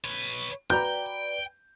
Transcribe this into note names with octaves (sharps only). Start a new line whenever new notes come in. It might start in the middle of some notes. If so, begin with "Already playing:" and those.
B4 C#5
F#4 B4 D5 G5 A#5 B5 G6